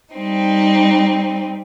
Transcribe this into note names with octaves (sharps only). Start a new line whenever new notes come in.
G3 C4 D#4